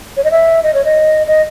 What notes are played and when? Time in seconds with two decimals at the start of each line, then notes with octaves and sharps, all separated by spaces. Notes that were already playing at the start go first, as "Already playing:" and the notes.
0.17 C#5
0.24 D#5
0.31 E5
0.63 D#5
0.74 C#5
0.85 D#5
1.28 D#5